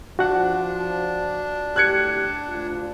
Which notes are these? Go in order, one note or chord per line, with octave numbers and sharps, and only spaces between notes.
F3 D4 F#4 F#5
A2 G4 F#6 G#6 C#7
D2 F4